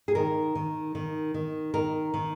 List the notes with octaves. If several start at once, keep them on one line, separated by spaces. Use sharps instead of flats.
G#4
D#3 A#4
D#3
D#3
D#3
D#3 A#4
D#3